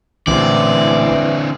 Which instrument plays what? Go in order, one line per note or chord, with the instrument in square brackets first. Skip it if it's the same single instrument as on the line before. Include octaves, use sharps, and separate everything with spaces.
[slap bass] A1 A#2 [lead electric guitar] D3 C4 [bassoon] E3 [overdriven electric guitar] D5